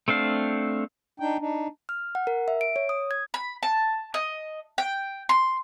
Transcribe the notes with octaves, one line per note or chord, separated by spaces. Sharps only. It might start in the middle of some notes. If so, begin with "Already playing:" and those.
A3 C4 D4 F5
D4 D#4 G5
D4 D#4
F6
F#5
A#4
E5
D7
C#5
D#6
G#6
B5
A5
D#5
G5
C6